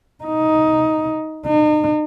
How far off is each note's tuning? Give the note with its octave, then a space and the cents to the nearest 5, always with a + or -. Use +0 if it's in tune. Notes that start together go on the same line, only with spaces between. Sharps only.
D#4 +10
D#4 -40